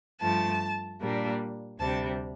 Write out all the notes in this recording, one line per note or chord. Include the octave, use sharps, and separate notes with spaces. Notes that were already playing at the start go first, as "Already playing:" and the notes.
G2 F3 A3 A5
A#2 G3 A#3 D4
D2 C3 G3 D4 A5